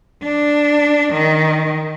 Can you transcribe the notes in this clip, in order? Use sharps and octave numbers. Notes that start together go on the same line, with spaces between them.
D4
D#3